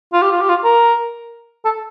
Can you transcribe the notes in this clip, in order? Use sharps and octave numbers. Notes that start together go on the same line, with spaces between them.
F4
G4
F4
G4
F4
A#4
A4